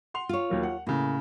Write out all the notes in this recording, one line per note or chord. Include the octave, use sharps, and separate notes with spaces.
F#5 C6 F7
F4 C#5
D#2 F#3 A#3
F#5
A2 C#3 A#3